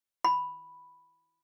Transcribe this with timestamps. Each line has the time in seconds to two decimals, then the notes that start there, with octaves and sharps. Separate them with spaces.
0.25 B5